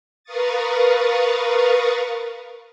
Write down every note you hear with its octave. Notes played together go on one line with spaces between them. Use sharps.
A#4 B4 F5 C#6 D#6 A6